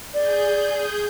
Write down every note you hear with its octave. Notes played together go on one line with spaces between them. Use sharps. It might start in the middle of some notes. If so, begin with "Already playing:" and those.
G#4 D5 G6